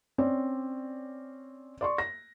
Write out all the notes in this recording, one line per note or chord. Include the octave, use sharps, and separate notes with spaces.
C4 C#4 D5
D5 C6 C#6
A#6